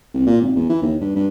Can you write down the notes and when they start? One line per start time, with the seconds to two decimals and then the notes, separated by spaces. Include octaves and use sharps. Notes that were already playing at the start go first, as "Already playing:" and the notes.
0.14 C2
0.27 A#2
0.42 G#1
0.56 E2
0.70 E3
0.82 D#2
1.01 G2
1.16 G2